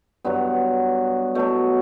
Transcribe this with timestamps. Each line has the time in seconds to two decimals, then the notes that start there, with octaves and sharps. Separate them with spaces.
0.25 G2 F#3 B3
1.35 B2 F#3 A3